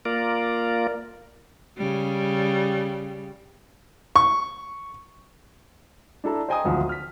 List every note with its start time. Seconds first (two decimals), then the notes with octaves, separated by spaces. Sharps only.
0.05 A#3 F4 A#4 D5
1.77 C#3 G3
4.16 C#6
6.24 D4 E4 A4 A#5
6.49 C5 D#5 G5 G#5 A#5 D#6
6.65 G#1 D2 F3
6.89 F6 B6